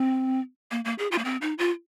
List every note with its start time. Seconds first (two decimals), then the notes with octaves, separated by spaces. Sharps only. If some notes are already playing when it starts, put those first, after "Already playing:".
Already playing: C4
0.71 A#3
0.85 A#3
0.99 G#4
1.12 F4
1.18 A#3
1.25 C4
1.41 D#4
1.58 F4